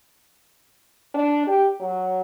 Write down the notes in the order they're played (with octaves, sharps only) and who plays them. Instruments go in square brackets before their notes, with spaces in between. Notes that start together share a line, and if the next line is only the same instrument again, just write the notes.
[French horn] D4
G4
F#3